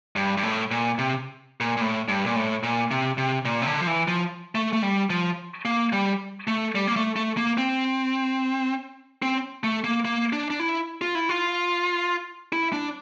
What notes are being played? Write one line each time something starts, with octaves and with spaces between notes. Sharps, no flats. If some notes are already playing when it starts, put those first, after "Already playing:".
G2
G2
A2
A#2
C3
A#2
A#2
A2
G2
A#2
A2
A#2
C3
C3
A#2
C3
D3
F3
E3
F3
A3
A3
G3
F3
A#3
G3
A3
G3
A#3
A3
A3
A#3
C4
C4
A3
A#3
A#3
D4
D4
E4
F4
E4
F4
E4
D4